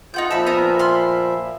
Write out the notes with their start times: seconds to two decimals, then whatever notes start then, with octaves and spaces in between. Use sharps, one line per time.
0.14 D#4 F4 F#5 G6
0.31 A#2 F3 E5 A5 B5
0.46 B3 A#4
0.79 B5 C6 F6